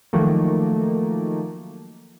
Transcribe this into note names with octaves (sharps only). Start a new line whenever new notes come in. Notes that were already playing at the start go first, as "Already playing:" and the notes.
D#3 F3 F#3 A3 A#3